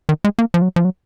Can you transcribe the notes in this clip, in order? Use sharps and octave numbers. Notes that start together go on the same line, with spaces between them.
D#3
G#3
A#3
F3
F#3
F3
F#3